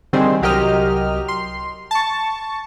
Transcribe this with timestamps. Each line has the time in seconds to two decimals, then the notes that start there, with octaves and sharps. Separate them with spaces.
0.13 D3 D#3 G3 C4 G#4 C5
0.42 C2 F#3 G4 A#4 D#5 F6
1.28 C6
1.91 A5 C#6